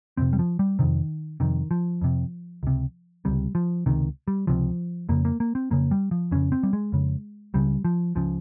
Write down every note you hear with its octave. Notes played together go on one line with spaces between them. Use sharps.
F2 C3 C4
G3
F3
G3
F2 C3 D#3
F2 C3 D#3
F3
F2 C3
C#2 C3
C#2 C3 G3
F3
C#2 C3 D#3
G3
C#2 C3 F3
F2 C#3 A#3
A#3
A#3
C4
F2 C#3 A#3
G3
F3
F2 C#3 C#4
C4
G3
G#3
F2 C#3
C#2 C#3 G3
F3
C#2 C#3 F3